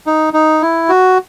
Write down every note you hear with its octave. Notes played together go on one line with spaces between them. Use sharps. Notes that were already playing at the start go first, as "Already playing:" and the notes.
D#4
D#4
E4
F#4